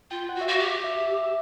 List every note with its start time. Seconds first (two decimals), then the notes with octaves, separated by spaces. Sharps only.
0.11 F4 G5
0.29 F#5
0.35 F#4
0.41 E5
0.47 F#4 F5
0.59 G4
0.84 E5